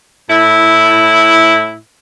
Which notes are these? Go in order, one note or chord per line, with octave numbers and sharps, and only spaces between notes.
A2 E4